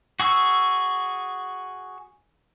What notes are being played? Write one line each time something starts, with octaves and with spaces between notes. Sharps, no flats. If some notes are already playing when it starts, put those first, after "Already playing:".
F#4 G#4 C#6 E6